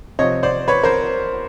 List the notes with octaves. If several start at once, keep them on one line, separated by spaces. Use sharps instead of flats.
C3 F3 C#5 D#5
C5 D5
B4 C#5
A#4 C5